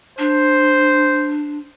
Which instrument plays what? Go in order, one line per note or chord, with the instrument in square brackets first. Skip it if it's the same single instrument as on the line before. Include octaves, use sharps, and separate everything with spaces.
[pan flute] D4 [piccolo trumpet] C5